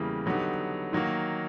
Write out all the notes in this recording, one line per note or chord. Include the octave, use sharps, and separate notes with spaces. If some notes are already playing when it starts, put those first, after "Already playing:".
Already playing: E2 C#3 E3 G3 A#3
D3 F#3 B3 D#4 G4
D#3 F#3 A#3